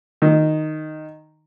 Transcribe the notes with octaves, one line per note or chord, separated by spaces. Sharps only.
D#3